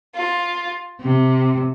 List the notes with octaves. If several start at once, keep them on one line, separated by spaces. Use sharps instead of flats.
F4
C3